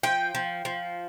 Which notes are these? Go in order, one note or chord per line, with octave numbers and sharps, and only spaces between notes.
F3 G5
F3
F3